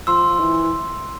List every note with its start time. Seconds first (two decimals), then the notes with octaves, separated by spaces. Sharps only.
0.07 F3 C6 E6
0.40 E3